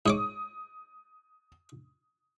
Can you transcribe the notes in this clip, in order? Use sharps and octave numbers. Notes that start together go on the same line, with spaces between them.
G#2 C#5 D6 D#6